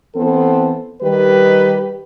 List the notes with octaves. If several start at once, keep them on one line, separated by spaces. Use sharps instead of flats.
E3 B3 C4 A4
D#3 G3 G4 B4